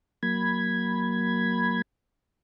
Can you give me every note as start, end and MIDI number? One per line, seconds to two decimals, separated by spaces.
0.23 1.82 54
0.23 1.82 58
0.23 1.82 83
0.23 1.82 92